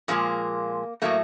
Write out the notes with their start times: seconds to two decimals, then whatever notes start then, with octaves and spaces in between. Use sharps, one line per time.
0.08 A#2 F3 G#3 A#3
1.02 A2 F#3 A3 A#3